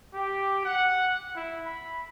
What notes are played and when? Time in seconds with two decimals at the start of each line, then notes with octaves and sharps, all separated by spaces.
0.14 G4
0.64 F#5
1.35 E4
1.66 B5